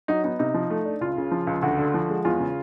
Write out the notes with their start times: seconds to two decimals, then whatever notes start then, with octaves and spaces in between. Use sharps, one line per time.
0.08 F#3 D#4
0.24 B3 D#4
0.39 C3 D#4
0.54 F3
0.70 A3
0.85 D4
1.01 C#2 F4
1.17 C#3
1.31 F3
1.47 C#2
1.62 D2 F#4
1.78 D3
1.94 F3
2.09 G#3
2.25 E2 F4
2.40 C#3